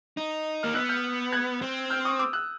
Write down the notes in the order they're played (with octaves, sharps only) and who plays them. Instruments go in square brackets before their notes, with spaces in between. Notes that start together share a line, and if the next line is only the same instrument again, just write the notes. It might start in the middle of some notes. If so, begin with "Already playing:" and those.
[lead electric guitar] D#4
[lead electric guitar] A#3 [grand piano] F6
[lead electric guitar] B3 [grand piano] E6 F#6
[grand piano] F6 G6
F#6 G#6
[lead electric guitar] C4
[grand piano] F6 G6
C#6 D#6
D6 E6
E6 F#6